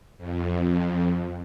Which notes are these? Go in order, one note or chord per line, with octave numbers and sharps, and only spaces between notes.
F2